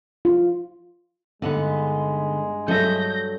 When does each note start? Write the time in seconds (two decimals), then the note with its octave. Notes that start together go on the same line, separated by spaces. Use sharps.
0.25 F4
1.42 G2 D3 G#3 B3 D#4 F#5
2.68 G2 F#3 A4 D#5 E5 G6 A#6